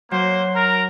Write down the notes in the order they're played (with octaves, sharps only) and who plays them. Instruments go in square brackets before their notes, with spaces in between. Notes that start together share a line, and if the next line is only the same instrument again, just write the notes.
[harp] F#3 [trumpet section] A#3 C5
[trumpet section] A#4 [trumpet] A#5